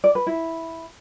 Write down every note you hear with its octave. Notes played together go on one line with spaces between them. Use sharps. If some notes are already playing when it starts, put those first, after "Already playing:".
D5
B4
E4